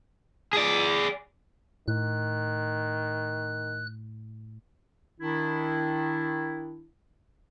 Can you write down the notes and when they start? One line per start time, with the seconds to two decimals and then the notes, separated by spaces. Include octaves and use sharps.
0.53 G#4 D5
1.88 A2 D#3 F#6
5.20 D#3 D4 E4